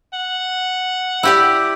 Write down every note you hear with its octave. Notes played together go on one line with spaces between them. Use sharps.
F#5
E4 G4 D5